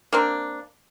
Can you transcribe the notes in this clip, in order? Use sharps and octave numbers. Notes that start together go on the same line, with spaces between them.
A#3 C4 D4